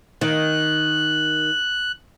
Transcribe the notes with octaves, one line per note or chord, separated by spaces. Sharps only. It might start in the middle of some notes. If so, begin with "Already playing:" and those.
D#3 F#6